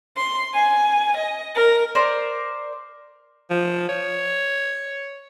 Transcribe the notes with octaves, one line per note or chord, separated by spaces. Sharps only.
C6
G#5
D#5
A#4
A#4 C5 D5
F3
C#5